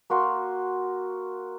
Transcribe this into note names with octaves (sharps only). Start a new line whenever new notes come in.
A#3 F#4 A#4 C6